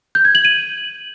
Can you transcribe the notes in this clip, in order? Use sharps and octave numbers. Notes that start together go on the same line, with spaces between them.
G6
G#6
F#7
D#7